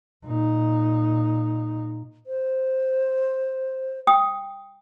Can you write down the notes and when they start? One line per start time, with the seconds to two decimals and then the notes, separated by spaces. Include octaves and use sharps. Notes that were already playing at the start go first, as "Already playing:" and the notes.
0.24 A#2 D#4
2.27 C5
4.07 G5 D#6